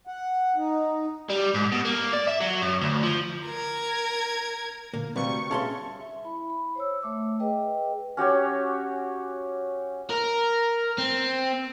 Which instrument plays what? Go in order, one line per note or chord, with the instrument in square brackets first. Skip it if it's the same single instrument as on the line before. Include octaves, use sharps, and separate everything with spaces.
[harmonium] F#5
D#4
[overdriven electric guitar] G3
G#2
B2
A#3
D5
E5
F#3
F#2
D2
F3
[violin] A#4 G#6
[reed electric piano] A#2 D3 [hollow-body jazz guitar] A#3
[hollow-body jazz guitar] D2 C3 [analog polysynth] G3 C#6 [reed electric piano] C4 [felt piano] B4 F5
[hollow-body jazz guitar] C#4 B5 C6 [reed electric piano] G#4 E5 F5 [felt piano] A5
[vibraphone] E5
E4 B5
B5
C5 C#5 E6
A3 E5 D6
G#4 B4 D#5 G5
[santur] C#4 F#4 G4 C#5
[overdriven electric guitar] A#4
C4